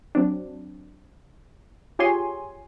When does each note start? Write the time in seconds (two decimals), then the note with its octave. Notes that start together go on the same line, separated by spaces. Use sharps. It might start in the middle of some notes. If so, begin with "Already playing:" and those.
0.15 F#3 C4 D4
1.99 F4 G4 G#4 C#5 G#5 C6